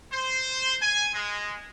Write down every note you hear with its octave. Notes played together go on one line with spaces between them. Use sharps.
C5
G#5
G#3